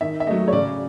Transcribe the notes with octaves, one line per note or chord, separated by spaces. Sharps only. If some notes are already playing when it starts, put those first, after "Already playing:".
D#3 E5
E5
F#3 A3 D#5
C#5
C#3 D5